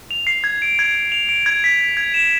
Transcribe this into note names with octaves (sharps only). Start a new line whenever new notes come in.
F7
C7
G#6
D7
G#6
G#6
F7
D7
G#6
B6
G#6
G#6
E7